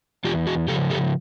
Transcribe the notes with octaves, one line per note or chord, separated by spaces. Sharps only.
E2 F4 G4
F#4 G#4
C#3 F3 G4 A4
G4 A4